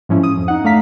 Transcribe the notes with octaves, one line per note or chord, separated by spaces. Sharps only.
G#2 F3 C#4 E4
D#6
F2
D#4 F#5
A3 D4 F5 A#5 B6